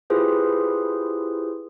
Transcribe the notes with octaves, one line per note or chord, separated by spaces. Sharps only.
E4 F4 G4 G#4 B4 C5